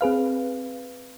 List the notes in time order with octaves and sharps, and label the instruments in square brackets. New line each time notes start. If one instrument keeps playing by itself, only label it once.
[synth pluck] C4 G#4 B4 F5